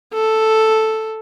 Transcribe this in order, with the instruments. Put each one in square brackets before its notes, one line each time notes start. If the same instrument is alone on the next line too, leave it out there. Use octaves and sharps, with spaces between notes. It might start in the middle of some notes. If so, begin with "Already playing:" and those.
[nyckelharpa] A4